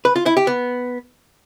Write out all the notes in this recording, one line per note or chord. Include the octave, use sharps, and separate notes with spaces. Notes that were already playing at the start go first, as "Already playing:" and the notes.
B4
F4
E4
G4
B3